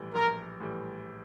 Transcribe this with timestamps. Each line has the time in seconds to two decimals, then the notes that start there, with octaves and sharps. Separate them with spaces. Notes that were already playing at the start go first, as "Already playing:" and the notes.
Already playing: A#1 A2 E3 G3
0.14 A#1 A#4
0.60 A2 E3 G3